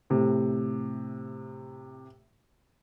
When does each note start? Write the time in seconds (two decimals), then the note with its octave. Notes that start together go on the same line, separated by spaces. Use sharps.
0.10 A2 C3